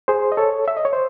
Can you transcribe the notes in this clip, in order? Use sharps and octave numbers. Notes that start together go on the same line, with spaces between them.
G#4 C5
D#5
A4 C#5
E5
D#5
C#5
C5